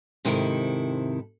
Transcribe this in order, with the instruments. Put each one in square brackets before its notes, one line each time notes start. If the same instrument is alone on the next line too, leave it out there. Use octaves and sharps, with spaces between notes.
[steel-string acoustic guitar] G#2 C3 D#3 E4 A4